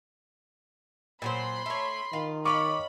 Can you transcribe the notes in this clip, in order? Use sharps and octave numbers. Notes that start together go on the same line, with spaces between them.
A#2 F#3 C5 B5 C6
A3 C#5
D#3 F4
F4 C#5 D#5 B5 C#6 D6